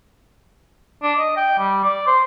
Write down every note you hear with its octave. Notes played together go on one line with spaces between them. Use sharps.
D4
D#5
G5
G3
D5
C5